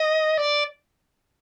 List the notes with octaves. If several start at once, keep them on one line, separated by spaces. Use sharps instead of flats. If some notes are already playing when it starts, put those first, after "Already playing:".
Already playing: D#5
D5